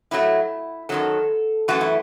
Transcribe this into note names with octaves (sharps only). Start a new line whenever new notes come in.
A2 F#3 A3 E4
F#2 D#3 F#3 A4
F#2 E3 A3 F#4
E4